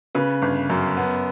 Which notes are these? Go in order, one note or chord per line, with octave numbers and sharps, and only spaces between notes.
C#3 B4
G1
F#2
B3